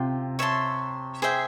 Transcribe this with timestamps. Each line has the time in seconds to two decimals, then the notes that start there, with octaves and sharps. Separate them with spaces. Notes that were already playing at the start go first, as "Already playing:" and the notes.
Already playing: C3 F4 G5
0.39 C#5 E5 A5 C6
1.22 G#4 C5 E5 G5